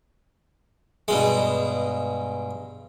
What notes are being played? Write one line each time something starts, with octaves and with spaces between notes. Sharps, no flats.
G2 B2 G#3